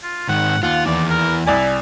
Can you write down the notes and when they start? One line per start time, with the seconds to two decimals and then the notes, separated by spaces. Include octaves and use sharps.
0.03 F4
0.29 G#2 D#3 F#5
0.63 D#2 F4 F#5
0.86 E2 E3 D5
1.10 A#4
1.46 C2 E4 D5 G#5